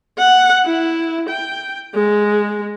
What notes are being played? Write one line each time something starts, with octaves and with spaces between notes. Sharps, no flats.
F#5
E4
G5
G#3